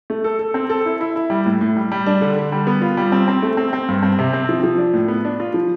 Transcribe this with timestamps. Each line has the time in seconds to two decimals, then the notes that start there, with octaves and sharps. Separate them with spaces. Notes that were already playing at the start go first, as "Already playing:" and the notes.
0.10 A3
0.24 A4
0.39 A4
0.54 C4
0.70 A4
0.85 E4
1.01 E4
1.16 E4
1.30 G3
1.46 A2
1.61 A2
1.76 G3
1.92 G3
2.06 D4
2.21 D3
2.36 D3
2.52 G3
2.67 B3
2.82 F4
2.97 G3
3.12 C4
3.28 C4
3.42 A3
3.57 C4
3.73 C4
3.88 G2
4.03 C4
4.19 C3
4.33 C4
4.49 F3
4.64 F3
4.78 D4
4.93 A2
5.08 B3
5.25 D4
5.40 F4
5.54 F3